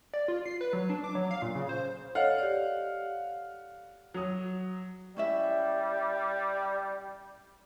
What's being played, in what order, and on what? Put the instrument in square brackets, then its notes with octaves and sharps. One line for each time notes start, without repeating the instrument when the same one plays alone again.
[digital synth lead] D5
F4
C7
B4
F#3
D4
D6
F#3
F5
A#2
C#3
C5
[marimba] A4 C#5 D#5 [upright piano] F5 F#5
[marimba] G4 D5
[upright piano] F#3 D#6
[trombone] G3 [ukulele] C#4 E4 E5